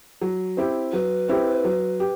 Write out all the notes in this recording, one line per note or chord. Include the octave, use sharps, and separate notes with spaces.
F#3
C4 E4 G4
F#3 B4
C4 E4 G4
F#3
G4